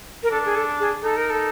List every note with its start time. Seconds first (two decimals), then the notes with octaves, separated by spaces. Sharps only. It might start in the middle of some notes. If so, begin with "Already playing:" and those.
0.23 A#4
0.31 D4 A4
0.45 G#4
0.56 A4
0.80 G#4
1.03 D#4 A4
1.17 A#4
1.30 A4